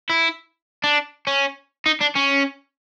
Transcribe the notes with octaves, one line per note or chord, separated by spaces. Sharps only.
E4
D4
C#4
D#4
D4
C#4